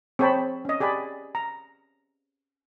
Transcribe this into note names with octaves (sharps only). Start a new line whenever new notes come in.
C4 G#4 C#5 G5 A5 B5
C#4 D#5
G4 G#4 D5 G#5 B5
A#5